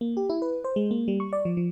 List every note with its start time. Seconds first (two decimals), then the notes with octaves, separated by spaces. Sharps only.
0.01 A#3
0.17 G4
0.30 E4
0.42 B4
0.64 C5
0.76 G#3
0.91 A#3
1.08 G3
1.20 C#6
1.33 D5
1.45 F3
1.57 F3